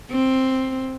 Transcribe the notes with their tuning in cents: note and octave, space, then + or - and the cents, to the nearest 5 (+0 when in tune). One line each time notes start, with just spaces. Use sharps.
C4 +5